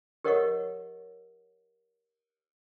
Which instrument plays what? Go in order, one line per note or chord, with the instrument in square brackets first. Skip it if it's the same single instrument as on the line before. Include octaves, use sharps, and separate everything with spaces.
[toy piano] G4 A#4 C#5 D#5 F#5 C#6